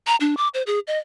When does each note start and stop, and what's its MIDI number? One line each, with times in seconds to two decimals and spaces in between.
0.07 0.16 82
0.20 0.35 62
0.37 0.48 86
0.54 0.62 72
0.67 0.79 68
0.87 0.98 75